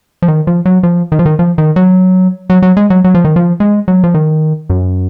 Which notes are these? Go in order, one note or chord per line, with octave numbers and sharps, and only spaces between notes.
F3
D#3
F3
F#3
F3
D#3
F3
D#3
F3
D#3
F#3
F#3
F#3
G#3
F#3
F#3
F3
D#3
F3
G#3
F#3
F3
D#3
F#2